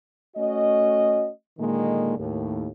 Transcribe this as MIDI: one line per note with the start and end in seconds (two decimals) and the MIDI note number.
0.37 1.29 57
0.37 1.29 61
0.37 1.29 66
0.37 1.29 75
1.59 2.16 46
1.59 2.16 50
1.59 2.16 51
1.59 2.16 56
1.59 2.16 58
2.18 2.69 39
2.18 2.69 45